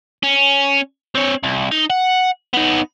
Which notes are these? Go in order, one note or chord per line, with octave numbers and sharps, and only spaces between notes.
C#4
C4 C#5
C2
D#4
F#5
B3 D#4